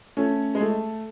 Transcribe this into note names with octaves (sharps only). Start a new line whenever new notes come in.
A3 C#4
G#3
A3